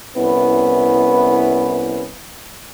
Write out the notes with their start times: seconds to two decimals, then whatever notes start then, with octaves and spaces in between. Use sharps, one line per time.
0.17 C2 B3 C#4 E4 B4